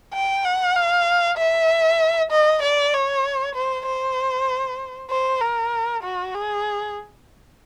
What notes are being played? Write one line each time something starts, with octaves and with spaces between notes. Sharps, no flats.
G5
F#5
F5
E5
D#5
D5
C#5
C5
C5
C5
A#4
F#4
G#4